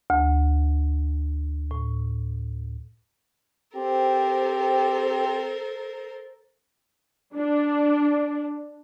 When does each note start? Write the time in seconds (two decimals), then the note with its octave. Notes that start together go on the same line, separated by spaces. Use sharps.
0.10 D2
1.71 A2
3.76 C4 G4 A4 A#4 C5
7.37 D4